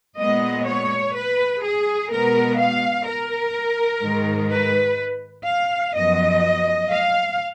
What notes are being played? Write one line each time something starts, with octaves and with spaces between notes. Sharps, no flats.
A#2 G#3 B3 D#5
C#5
B4
G#4
B2 G#3 B3 A#4
F5
A#4
G#2 D#3 G#3
B4
F5
F#2 F3 B3 D#5
F5